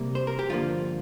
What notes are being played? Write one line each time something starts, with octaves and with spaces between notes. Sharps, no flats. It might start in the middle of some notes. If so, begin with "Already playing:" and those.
Already playing: C3 G3 A#3
C5
A#4
G4
G2 D3 F3 A#3 F4